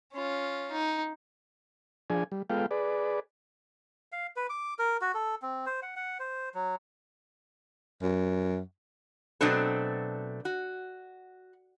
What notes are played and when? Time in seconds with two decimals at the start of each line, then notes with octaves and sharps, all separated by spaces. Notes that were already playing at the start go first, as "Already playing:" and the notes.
0.13 C#4 F4
0.72 D#4
2.10 F3 D4 G#4 G#5
2.32 G3
2.50 G#3 B3 F4 A4 F5 G5
2.71 G#4 B4 D5
4.12 F5
4.36 B4
4.49 D6
4.79 A#4
5.01 F#4
5.14 A4
5.42 C4
5.66 C5
5.82 F#5
5.96 F#5
6.19 C5
6.54 F#3
8.02 F#2
9.41 B2 F#3 A3 C4 D4 A4
10.45 F#4